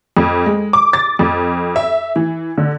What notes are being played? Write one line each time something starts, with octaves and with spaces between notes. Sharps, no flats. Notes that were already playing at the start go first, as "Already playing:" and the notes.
F2
G#3
D6
A6
F2
E5
E3
D3